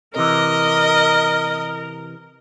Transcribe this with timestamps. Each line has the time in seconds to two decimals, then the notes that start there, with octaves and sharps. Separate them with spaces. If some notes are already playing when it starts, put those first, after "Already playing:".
0.16 C3 E3 A#4 D#5